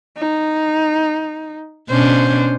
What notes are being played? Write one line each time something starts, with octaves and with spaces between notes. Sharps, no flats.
D#4
B2 C#4 D4 C5